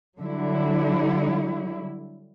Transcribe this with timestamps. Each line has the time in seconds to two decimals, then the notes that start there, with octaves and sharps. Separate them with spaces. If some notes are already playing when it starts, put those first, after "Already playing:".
0.19 D3 F#3 G3 E4